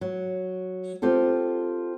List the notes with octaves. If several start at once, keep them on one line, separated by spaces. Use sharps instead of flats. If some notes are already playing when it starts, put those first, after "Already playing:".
F#3
C4 F4 G4 A4